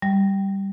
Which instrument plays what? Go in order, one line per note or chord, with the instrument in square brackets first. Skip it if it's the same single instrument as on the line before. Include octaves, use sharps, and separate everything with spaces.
[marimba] G3